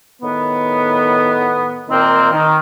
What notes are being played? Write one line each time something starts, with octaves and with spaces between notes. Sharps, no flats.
A2 D#3 B3
A#2 D#3 A#3 C4
D#3